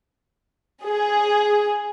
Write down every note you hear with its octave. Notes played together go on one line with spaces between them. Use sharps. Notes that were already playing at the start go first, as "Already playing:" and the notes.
G#4